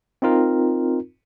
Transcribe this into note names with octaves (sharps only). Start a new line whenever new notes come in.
C4 D#4 F4 A#4